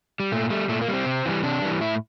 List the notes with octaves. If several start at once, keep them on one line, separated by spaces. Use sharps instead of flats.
G3
A#2 A3
G3 A3
A#2 A3
A#3
G3
C4
C3
E3 G3
C3 D4
E3 G3
A2 E4